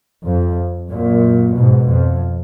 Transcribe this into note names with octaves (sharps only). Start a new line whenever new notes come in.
F2
F#2 A#2
G#2 B2
F2